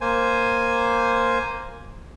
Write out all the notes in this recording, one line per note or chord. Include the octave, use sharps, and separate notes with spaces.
A#3 C5 G#5